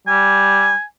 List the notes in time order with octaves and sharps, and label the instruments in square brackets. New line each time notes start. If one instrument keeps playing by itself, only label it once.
[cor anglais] G3 [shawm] G#5